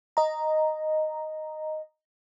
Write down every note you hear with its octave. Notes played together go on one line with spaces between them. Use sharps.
D#5 A#5